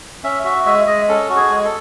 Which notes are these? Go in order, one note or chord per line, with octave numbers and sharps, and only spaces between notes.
C#4 E5
F#4 E5
G#3 E5
G#3 D#5
C#4 A4
F#4
G#4
G#3
A4